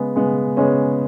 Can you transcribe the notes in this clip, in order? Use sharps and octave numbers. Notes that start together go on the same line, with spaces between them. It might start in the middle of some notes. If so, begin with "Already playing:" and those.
Already playing: C#3 G#3 B3
C#3 G#3 B3
C#3 G#3 B3 C#4